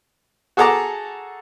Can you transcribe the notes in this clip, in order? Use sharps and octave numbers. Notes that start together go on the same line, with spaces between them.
F#4 G#4 A4 A5 A#5 D6